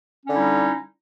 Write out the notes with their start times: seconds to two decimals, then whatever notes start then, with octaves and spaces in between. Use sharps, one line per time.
0.25 C#4
0.28 D3
0.30 D#4
0.33 G3
0.36 E4